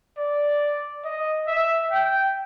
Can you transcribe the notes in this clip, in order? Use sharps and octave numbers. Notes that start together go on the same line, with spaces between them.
D5
D#5
E5
G5